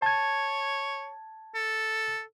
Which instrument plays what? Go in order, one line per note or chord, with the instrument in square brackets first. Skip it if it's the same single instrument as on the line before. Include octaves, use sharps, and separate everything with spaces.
[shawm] C#5 [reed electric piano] A5 G#6
[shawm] A4